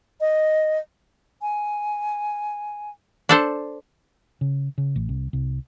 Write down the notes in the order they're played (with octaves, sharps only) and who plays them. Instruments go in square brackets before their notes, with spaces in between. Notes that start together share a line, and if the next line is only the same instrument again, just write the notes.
[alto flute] D#5
G#5
[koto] D4 A4 C5
[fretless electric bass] C#3
C#3
A1
C2
C2